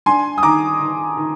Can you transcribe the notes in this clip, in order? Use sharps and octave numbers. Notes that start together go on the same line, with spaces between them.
D4 G#5 C6
D#6
D#3 A#5 D6
D#3
D#3